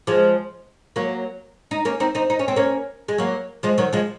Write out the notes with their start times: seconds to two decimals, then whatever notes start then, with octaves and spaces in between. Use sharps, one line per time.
0.07 F3 G#3
0.96 F#3 A#3
1.71 D#4
1.85 A#3 C#4
2.00 C4 D#4
2.15 C4 D#4
2.30 D#4
2.39 C#4
2.48 C4
2.56 A#3 C#4
3.08 G#3
3.18 F#3 A#3
3.63 F3 G#3
3.78 D#3 F#3
3.93 F3 G#3